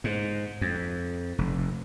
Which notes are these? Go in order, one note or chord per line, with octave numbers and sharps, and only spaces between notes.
G#2
F2
F1